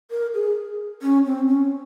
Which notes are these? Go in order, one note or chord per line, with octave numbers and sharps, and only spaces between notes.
A#4
G#4
C#4
C4
C#4